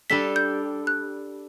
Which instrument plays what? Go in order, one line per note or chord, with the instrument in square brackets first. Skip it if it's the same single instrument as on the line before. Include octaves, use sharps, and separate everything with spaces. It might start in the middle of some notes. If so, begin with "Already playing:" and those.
[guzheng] G3 D4 A4 [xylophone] B6
[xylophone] G6
F#6